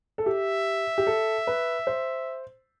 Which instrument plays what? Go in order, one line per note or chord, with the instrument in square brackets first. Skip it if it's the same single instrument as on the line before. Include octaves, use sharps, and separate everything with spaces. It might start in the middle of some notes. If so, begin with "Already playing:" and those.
[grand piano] A4
[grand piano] G4 [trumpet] E5
[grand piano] G4
A4
B4
C5